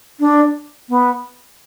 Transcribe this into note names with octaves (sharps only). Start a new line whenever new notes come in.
D4
B3